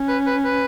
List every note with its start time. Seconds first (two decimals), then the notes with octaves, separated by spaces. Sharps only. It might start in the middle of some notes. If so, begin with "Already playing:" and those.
Already playing: C#4
0.08 B4
0.27 B4
0.45 B4